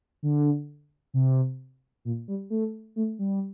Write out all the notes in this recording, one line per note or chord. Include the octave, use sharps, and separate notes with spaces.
D3
C3
A#2
G3
A3
A3
G3